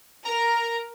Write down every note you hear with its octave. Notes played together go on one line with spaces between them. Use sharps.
A#4 A#5